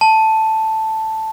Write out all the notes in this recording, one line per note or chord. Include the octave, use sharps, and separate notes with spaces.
A5